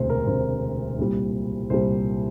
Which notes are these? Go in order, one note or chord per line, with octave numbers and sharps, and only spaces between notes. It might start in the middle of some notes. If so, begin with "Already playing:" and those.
Already playing: E1 D2 C3 C5
A#4
E1 D2 C3 C5
C2 A#2 G3
C2 A#2 G3 C5